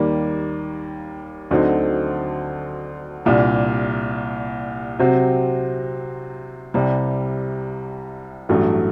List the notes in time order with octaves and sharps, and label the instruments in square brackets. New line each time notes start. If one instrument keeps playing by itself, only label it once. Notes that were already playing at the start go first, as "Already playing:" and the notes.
Already playing: [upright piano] D#2 D#3 G3 A#3
D2 D3 F#3 C4 D#4
C2 A#2 G3 D4
C3 F#3 C4 F#4
C2 C3 G3
A1 G2 F#3 A3